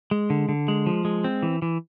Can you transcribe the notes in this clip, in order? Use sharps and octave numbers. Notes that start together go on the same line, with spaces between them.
G#3
D3
D3
G#3
F3
G#3
C4
E3
E3